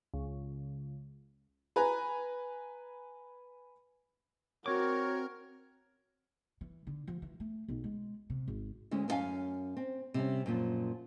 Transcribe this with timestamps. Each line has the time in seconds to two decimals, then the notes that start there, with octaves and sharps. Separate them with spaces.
0.14 C#2
1.76 B4 G#5 A#5
4.66 C4 F#4 A#4 C#5 D6
6.61 E3
6.87 D3
7.07 F3
7.22 E3
7.40 A3
7.68 B1
7.84 G#3
8.30 C3
8.48 G#1
8.91 D2 G#3 C#4
9.08 F#2 B3 C#4 F5 G#5
9.77 C4
10.14 C3 G3 C#4
10.46 F#2 A#2 F3